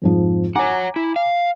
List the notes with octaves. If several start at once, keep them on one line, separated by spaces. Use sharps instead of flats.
F2 G#2 F3
C#5 F#5 G#5 A#5 D6
E4
F5